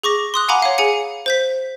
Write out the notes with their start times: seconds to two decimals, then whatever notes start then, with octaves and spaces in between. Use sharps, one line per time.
0.03 G#4 C#6 D6 A#6
0.34 C6 D#6 F#6
0.48 F5 F#5 G#5 A#5 B5 D6
0.62 C#5 F5
0.78 G#4 F5 G#5 C#7
1.26 C5 G6 B6